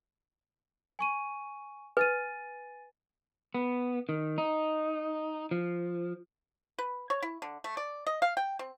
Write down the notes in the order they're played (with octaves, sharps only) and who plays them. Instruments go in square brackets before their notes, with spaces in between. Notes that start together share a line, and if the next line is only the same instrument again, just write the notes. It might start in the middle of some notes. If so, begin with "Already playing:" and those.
[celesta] G#5 C#6 D#7
[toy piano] B4 [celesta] G#5 A6 D#7
[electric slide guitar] B3
D#3
D#4
F3
[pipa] B4
C#5
E4
D3
A3
D5
D#5
F5
G5
C4